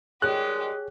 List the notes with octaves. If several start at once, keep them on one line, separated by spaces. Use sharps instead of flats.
D#3 G3 G#3 G4 G#4 C#5 F#6